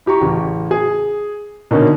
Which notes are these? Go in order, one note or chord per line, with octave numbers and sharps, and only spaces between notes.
E4 G4 A#5 C#6
A1 C#3
G#4
B2 D3 D#3 A#3 C#4 D#4